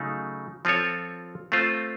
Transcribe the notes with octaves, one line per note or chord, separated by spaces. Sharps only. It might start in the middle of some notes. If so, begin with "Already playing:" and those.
Already playing: C#3 F#3 A3 D#4
F3 C4 F4 A4 C#5
A3 C4 F4 C5